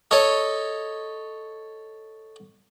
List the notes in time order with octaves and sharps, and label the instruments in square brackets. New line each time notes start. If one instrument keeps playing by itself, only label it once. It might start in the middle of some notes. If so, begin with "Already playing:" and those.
[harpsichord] A4 C#5 D#5